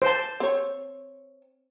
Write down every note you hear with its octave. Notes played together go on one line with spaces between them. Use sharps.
C5 A5
C4 C#5